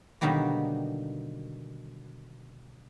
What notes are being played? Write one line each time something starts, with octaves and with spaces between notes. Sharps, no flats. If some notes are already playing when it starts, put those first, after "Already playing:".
B2 D3 D#3 F#3 G3 A#3